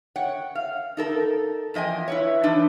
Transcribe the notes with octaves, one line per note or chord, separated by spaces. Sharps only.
C#5 F#5 G5
F5
D#4 A4 A#4
E2 F3 D#5 G5 G#5
E4 B4 C#5
E3 F3 D4 D#4